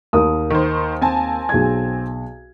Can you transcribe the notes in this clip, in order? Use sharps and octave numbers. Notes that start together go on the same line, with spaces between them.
D#2 A#4 D#6
D#3 C5
C4 G#5 A5
B1 G#4 G#6